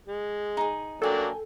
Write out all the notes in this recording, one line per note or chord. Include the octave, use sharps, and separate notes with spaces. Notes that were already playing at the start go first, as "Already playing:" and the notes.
G#3
D#4 G#4
F#3 A#3 D4 A4 G5 G#5